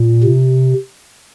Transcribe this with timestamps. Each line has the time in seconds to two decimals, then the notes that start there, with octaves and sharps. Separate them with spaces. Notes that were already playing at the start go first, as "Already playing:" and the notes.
Already playing: A#2
0.23 C3